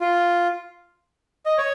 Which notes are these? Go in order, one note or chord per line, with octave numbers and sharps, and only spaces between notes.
F4
D#5
C#5